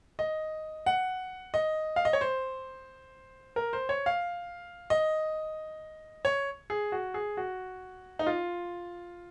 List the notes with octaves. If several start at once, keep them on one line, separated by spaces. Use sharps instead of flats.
D#5
F#5
D#5
F5
D#5
C#5
C5
A#4
C5
C#5
F5
D#5
C#5
G#4
F#4
G#4
F#4
D#4
F4